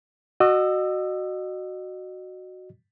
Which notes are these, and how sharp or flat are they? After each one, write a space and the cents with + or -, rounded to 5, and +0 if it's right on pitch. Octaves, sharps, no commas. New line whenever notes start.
F#4 +0 D#5 -30 E6 +5